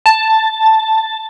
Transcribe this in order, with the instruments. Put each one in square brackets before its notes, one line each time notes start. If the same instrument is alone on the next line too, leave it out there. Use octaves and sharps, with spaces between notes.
[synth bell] A5